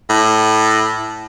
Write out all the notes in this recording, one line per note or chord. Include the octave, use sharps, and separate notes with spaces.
A2